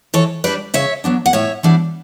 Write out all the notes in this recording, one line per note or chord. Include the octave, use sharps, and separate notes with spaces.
E3 A4 C#5
G3 D4 B4 D5
C#3 C#5 E5
F#3 B3 D4
F#5
A2 C#5 E5
E3 G3 B3 D4